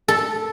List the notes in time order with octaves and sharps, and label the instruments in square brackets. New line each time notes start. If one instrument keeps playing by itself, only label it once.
[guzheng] A4